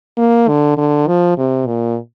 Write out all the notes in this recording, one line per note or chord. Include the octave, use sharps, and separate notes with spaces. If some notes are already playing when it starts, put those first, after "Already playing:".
A#3
D3
D3
F3
C3
A#2